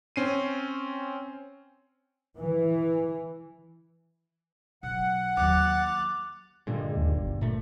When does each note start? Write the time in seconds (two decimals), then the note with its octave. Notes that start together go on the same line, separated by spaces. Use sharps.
0.16 C4 C#4 C7 D#7
2.37 E3
4.83 B1 F#5
5.37 D#2 F#3 D6 F#6 A6
6.67 G2 A#2 D3 G#3
6.96 D#2
7.17 G1
7.42 A#2 A3